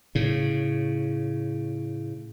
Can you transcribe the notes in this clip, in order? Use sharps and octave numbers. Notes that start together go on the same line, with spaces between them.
A2 C#3